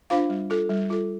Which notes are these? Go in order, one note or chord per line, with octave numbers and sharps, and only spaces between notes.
D4 F4 C5 F5
G3
F4 A4
G3
F4 A4